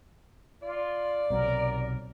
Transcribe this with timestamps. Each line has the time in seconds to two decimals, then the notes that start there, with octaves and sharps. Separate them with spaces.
0.62 F4 D5
1.30 B1 C3 F#3 A#4